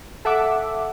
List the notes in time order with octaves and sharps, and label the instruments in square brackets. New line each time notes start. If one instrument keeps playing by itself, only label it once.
[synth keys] A4 E5 F#5 D6